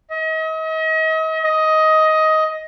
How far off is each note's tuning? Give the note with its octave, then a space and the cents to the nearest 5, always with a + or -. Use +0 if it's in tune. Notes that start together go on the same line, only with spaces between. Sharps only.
D#5 +40
D#5 +15